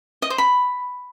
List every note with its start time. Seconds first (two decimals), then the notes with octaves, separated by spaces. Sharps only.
0.22 D#5
0.30 C5
0.38 B5